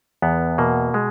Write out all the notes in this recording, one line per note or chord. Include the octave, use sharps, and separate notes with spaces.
E2 B3
B2 A#3
G#3